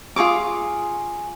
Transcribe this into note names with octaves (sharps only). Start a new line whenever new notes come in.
F4 G#4 C#6 D6